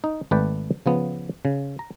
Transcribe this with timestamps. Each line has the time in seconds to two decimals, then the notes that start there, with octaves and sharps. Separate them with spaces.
0.04 D#4
0.31 G#1 A3 B4 D5 G5
0.86 C#3 F3 B3
1.45 C#3
1.79 A#5